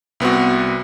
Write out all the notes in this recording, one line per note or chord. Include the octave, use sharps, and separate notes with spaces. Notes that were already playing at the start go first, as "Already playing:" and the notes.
C2 B3 C4 F#4